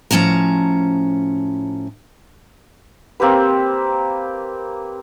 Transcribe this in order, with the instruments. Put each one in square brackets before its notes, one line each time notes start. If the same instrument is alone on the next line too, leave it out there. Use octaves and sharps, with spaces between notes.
[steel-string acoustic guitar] A2 F3 C#4 A5 A#5
[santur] A#3 C4 G4 B4